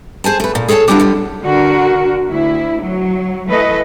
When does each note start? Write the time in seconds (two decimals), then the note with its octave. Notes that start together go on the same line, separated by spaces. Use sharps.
0.24 G#4 C5 G#5 A5
0.40 A3 B4
0.55 A#2
0.68 G#4 A4 C#5 F#5 A5
0.88 F#3 G3 B3 D4 E4 F4
0.99 D3 G3
1.43 D3 F#4 A#4
2.28 D2 E4
2.81 F#3
3.48 E3 A3 A4 B4 D#5